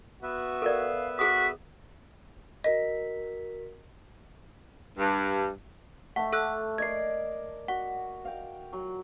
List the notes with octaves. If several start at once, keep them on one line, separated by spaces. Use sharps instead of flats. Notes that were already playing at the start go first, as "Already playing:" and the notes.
B3 F#4 B4 E5
A4 A#4 D5 F5
F#4 G#4 D#6 B6
F#4 A#4 D#5 B6
G2
A3 F#5 A5
A4 E6 F#6
A#4 D5 D#5 G#6 C7
F#4 F#5
F5 G5
F#3